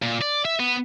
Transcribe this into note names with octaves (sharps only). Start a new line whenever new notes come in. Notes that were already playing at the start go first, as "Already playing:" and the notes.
A#2
D5
E5
B3